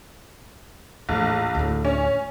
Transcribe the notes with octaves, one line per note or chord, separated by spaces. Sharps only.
A#1 E2 A2
D2 A2
C#4